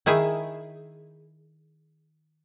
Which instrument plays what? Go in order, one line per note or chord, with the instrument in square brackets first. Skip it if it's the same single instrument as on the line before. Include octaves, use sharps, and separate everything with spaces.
[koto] D#3 E4 G#4